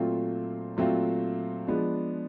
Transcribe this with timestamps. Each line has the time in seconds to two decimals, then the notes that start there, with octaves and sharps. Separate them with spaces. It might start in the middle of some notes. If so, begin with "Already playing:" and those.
Already playing: A#2 F#3 A3 C4 F4
0.77 A#2 F#3 A3 C4 F4
1.67 F3 G#3 B3 D4